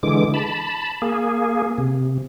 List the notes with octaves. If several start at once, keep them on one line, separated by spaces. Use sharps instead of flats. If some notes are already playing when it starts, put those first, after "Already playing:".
D3 E3 G#3 D6
A5 B5
A#3 G#4
C3